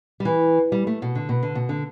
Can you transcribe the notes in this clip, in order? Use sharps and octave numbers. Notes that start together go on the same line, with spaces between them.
G3
E3
G3
A3
B2
D3
B2
D3
B2
D3